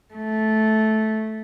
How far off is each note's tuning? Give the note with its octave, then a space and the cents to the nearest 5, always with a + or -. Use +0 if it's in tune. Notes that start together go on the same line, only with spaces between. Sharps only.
A3 -10